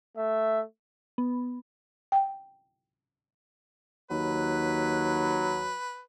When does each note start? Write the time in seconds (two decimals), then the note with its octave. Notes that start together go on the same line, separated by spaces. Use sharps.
0.17 A3 E5
1.18 B3
2.12 G5
4.11 D#2 F#3 B4